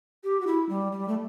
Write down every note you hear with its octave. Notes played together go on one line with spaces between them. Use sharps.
G4
F#4
E4
G3
G3
A3